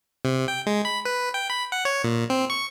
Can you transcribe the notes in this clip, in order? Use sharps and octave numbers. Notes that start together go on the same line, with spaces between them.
C3
G5
G#3
B5
B4
G5
B5
F#5
C#5
A#2
C4
C#6